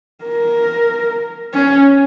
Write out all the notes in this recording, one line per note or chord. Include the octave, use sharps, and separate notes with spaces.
A#4
C#4